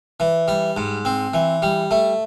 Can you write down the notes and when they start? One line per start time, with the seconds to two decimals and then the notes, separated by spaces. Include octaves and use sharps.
0.20 E3
0.48 G3
0.77 G#2
1.05 C4
1.34 E3
1.62 G3
1.91 A3